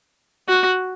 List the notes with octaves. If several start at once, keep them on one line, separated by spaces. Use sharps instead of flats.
F#4